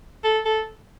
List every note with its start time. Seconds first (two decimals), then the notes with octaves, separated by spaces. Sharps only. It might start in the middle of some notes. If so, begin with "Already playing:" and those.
0.24 A4
0.45 A4